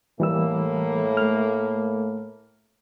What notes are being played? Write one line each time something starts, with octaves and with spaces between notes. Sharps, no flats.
A2 E3 G3 A#3 E6
A3 F6